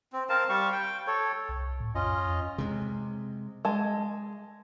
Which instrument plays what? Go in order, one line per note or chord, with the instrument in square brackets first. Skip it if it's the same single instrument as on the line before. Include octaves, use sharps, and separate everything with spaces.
[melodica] C4
C4 A#4 F5 A5
G3 F5 C#6
G5
A4 C#5
[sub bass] C2
A2
[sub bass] F#2 [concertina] C#4 F4 D#5
[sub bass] F2
[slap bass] C3 G#3
[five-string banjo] G#3 A5